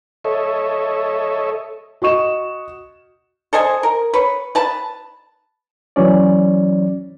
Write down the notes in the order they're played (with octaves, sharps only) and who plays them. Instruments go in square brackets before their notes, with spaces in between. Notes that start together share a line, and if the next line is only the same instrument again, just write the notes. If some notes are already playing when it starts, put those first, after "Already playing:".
[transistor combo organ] A4 C#5 D#5 E5
[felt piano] F#4 D#5 C#6 E7
[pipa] A4 C5 D#5 G#5
A#4
B4 C#5
B4 A5
[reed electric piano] E3 F#3 C#4 D5